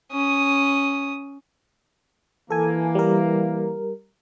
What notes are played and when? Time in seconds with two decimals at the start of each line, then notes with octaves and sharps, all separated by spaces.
0.12 C#4 D#6
2.50 E3 A#3 A4 G#5
2.95 G3 A#4